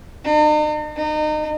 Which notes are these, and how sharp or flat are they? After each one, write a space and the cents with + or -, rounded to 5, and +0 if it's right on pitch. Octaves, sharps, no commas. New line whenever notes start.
D#4 -45
D#4 -30